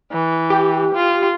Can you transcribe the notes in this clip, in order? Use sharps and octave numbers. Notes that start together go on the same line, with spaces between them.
E3
G4
F4